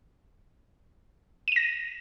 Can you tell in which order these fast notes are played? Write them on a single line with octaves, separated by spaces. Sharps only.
D#7 E7 A#6